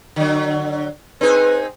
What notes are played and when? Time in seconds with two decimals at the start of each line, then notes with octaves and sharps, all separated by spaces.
0.16 D3 F#3
1.21 C4 D#4 G#4 B4